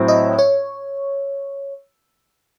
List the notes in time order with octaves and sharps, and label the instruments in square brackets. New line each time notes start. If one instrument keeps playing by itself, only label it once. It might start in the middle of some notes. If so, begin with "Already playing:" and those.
Already playing: [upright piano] A2 F#3 C4 E4
[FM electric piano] D#5
C#5